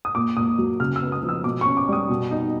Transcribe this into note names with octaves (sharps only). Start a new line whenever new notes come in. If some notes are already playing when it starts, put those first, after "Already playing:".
D#6
A#2 D6
A#2 D#6
F#3
C#3 F6
E6
B3
D#6
F3
E6
B2 D6
C#6
C#4
D6
G3 D#6
B2
D#4